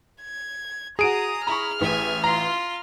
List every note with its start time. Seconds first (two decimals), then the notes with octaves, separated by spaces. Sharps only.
0.22 G#6
0.99 F#4 G#4 A#5 D#6 D7 D#7
1.47 E4 A#5 C#6 F6
1.81 A1 E5 G#5
2.24 F4 A#5 C6